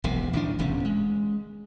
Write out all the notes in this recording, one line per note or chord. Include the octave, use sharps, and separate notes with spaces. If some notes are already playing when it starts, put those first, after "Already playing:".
E1 B1 C3
A1 D#3 A3 D4
D#1 E2 C3 C#4
G#3